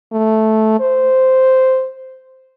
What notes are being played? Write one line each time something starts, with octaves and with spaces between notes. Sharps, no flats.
A3
C5